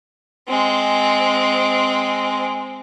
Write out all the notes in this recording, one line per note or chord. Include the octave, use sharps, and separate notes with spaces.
G#3 C4